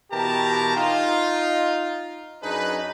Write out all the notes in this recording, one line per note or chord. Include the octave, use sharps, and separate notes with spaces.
B2 E3 G4 A#4 A5 A#5
D#4 F4
F#2 D4 D#4 G#4 B4